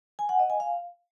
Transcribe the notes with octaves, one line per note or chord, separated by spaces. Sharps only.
G#5
F#5
D#5
G#5
F5